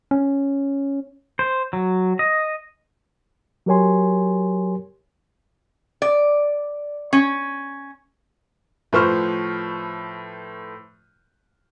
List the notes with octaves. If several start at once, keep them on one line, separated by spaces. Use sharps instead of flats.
C#4
C5
F#3
D#5
F#3 G4 A#4 C#5 G#5 C6
D5
C#4
A2 F3 B4 C5 C#6 F6